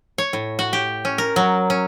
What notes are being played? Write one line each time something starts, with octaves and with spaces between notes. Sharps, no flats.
C#5
A2
F#4
G4
C#4
A#4
F#3
C#4